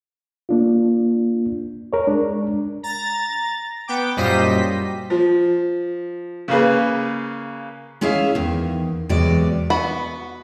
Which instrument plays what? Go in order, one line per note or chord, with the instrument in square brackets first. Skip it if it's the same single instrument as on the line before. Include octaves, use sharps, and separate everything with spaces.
[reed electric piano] A#3 D4 F4
A#4 C#5
G#3 D4
[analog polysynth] A#5 A6
B3 G5 D6
F#2 A#2 G3 C5 D#5 B6
[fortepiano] F3
C#3 A#3 G#4 B4
[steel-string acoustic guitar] G#3 C#4 E4 G#4 E5 F5
E2 D#3
E2 C3 F#3 G#3 D5
[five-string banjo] B3 F#4 B5